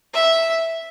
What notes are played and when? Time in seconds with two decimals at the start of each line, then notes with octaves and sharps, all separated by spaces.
0.14 E5